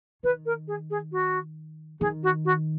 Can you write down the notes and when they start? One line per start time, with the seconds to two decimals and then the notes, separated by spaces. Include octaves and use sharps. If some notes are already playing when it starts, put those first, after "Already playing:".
0.23 D#3 B4
0.45 A#4
0.67 G#4
0.90 G#4
1.12 F#4
2.00 D#3 G#4
2.23 F#4
2.45 F#4